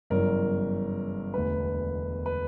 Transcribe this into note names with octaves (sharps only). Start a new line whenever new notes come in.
G1 F#2 C#3 E3 A#4
E1 D2 D3 B4
B4